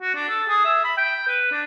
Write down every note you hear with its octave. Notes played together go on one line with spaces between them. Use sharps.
F#4
D4
A4
G#4
E5
B5
G5
B4
D4